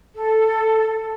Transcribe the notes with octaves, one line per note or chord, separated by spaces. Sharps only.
A4